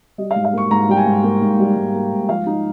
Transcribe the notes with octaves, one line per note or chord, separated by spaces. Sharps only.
G3 D#5
F5
G#2
F5
A#3 C#6
G#2 A#5
G3 G5
G#5
G#2
A#3
G#2
G3
G#2
A#3
G#2
F3 F5
D#4